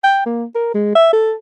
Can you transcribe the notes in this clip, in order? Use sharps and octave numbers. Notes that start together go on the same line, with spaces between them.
G5
A#3
A#4
G#3
E5
A4